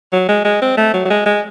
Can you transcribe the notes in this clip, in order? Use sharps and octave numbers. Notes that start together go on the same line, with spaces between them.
F#3
G#3
G#3
C4
A3
F#3
F#3
G#3
G#3